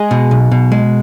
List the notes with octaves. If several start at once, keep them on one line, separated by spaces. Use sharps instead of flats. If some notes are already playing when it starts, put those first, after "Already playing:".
Already playing: G#3 G#4
B2
B1
B2
G#3